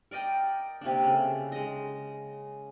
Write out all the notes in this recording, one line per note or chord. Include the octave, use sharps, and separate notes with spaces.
A#4 D5 D#5 G5
C3 A#3 D4
C#3 A4
G#3 D#5